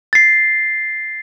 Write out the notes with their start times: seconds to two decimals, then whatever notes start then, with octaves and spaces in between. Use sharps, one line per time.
0.13 A6 C7